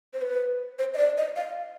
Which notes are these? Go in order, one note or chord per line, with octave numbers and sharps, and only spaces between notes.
C5
B4
C5
D#5
D5
D#5
F5